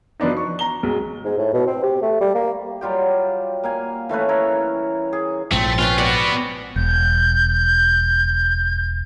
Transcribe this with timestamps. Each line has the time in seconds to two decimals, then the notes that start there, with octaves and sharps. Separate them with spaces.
0.20 F3 F#3 B3 D4 D#4
0.37 C#6
0.59 A#5 G7
0.83 B1 G#3
1.24 G#2
1.38 A2
1.54 B2
1.67 C4
1.83 G4
2.02 A3
2.21 G3
2.35 A#3
2.81 F#3 G3 F4 G4
3.64 A#3 F5 G#5
4.09 E3 A3 C#4 B4
4.29 E4 A#4 C#5
5.13 G#4
5.51 A#1 G#2 F3 A3 C4
5.79 C#4 F4 B4 G5
5.98 B3 F#4 D5 F#5
6.76 E1 G6